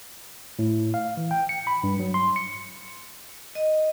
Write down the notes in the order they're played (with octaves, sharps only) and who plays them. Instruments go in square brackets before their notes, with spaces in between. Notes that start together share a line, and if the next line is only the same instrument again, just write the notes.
[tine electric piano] A2
F5
E3
G5
C#7
B5
G2
F#3
C6
C#7
[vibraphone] D#5